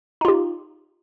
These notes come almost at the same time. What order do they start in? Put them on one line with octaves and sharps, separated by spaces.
D#4 F4 G4